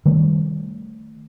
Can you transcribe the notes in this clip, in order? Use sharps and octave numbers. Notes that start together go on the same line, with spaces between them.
D#3 G3 A3